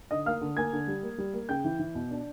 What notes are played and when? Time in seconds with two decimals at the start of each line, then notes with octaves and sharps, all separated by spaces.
0.11 D3 D#5 D#6
0.26 A#3 F5 F6
0.41 D3
0.57 A#3 G#5 G#6
0.73 D3
0.88 G3
1.03 A#3
1.18 G3
1.34 A#3
1.49 C#3 G5 G6
1.64 E3
1.79 E3
1.95 B2
2.11 D4